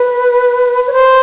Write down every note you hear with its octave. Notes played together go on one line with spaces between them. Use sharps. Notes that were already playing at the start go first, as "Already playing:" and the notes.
Already playing: B4
C#5
C5